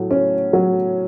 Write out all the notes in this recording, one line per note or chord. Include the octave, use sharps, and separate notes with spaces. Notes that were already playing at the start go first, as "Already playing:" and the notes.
Already playing: A2 F#3
C#4
F#3